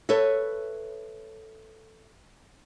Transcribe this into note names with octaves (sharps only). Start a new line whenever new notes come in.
A4 B4 C#5 E5